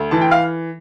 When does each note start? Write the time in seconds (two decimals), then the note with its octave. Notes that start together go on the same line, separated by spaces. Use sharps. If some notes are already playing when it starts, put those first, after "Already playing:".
Already playing: D2
0.11 E3 A5
0.21 G5
0.31 F5